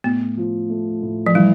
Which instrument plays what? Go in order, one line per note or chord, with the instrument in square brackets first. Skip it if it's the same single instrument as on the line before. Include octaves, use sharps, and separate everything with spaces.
[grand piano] A2 [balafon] B3
[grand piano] F3
A3
A2
[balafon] F3
[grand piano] E3 [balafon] G3